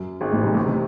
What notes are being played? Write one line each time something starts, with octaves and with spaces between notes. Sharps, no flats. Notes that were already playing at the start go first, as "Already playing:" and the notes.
Already playing: F#2
G#1 G#2
A1 A2
C2 C3
A1 A2
C3